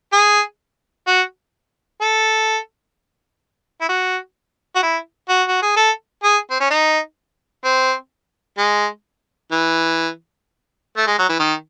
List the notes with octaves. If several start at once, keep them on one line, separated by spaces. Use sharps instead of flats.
G#4
F#4
A4
E4
F#4
F#4
E4
F#4
F#4
G#4
A4
G#4
C4
C#4
D#4
C4
G#3
E3
A3
G#3
F#3
E3
D#3